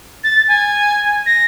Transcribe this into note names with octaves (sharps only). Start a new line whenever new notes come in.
A6
G#5
A#6